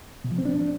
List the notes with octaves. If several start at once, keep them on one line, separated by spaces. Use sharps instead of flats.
B2
F3
C4
D4